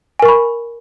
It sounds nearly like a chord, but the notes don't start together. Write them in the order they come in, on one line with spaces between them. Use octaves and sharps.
G#5 A#4 C#6 B5